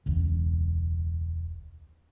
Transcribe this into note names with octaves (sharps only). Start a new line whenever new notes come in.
E1 C#2